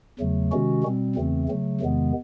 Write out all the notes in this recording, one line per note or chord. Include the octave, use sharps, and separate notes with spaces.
E2 C#3 F#3 A3
C3 D#3 G#3 C#4 F#4
B2 G3 C4
E2 C#3 E3 A3 C4
C#3 F#3 A3
E2 C3 D#3 G#3 B3